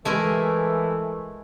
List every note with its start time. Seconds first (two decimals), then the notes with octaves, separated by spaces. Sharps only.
0.05 E3 G#3 A3 E4 A#4